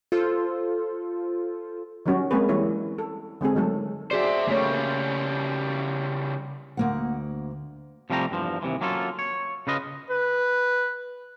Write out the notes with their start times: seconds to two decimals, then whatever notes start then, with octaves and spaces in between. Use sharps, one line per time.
0.12 F4 A4 C5
2.06 D#3 F#3 G3 C#4 F#4
2.31 G#3 A#3 C4 G#4 B4
2.49 E3 G3 E4 C#5
2.98 A4
3.41 D3 G#3 C4 G#4
3.55 D#3 F#3 A3 A4
4.11 F#4 G#4 C5 D5 E5
4.47 C#3 G3 A3 A#3 C#5
6.77 D2 A#3 F#5
8.10 C3 F3 G3 A3 G4 A#5
8.31 E2 G2 F3
8.62 D#2 C3 E3
8.81 F#3 A#3 C#4 F4 A4
9.19 C#5
9.67 C#3 F4 B4 D#5
10.10 B4